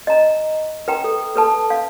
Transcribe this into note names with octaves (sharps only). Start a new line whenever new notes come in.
D#5 A#5
B4 G5 A#5
A4
A4 B4 A5
F5